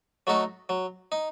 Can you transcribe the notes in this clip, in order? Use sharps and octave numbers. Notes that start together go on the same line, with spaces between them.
F#3 A3 D#4 F#4
F#3
D#4